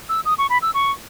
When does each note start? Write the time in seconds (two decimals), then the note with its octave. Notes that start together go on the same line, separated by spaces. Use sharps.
0.09 E6
0.25 D#6
0.38 C#6
0.50 B5
0.62 E6
0.74 C#6